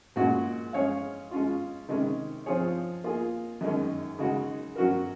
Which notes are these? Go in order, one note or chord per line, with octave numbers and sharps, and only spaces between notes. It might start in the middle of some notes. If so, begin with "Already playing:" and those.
A#2 G#3 C#4 F#4
G#3 C#4 G#4 C#5 F5
G#3 C#4 F4
C3 D#3 G#3 C#4
F3 C4 F4 G#4 C#5
A#3 F4 G#4
F#2 D#3 G#3 C#4
C#3 G#3 D#4 F#4
F#3 C#4 F#4 A#4